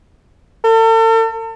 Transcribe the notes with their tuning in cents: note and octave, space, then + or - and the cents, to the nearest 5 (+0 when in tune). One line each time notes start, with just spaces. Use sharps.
A4 +40